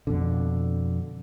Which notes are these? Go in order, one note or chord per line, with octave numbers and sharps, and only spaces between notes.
F2 B2 D3